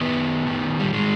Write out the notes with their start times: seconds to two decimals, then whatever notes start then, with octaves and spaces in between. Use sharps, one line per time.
0.01 D#3 B3
0.47 D#3
0.79 G3
0.93 D#3 G#3